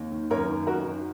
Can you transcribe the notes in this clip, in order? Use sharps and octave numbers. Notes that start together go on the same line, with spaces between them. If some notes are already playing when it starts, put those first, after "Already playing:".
Already playing: D#2
D#3
F#2 A#4 C#5
D#3
F#2 F#4 A#4
D#3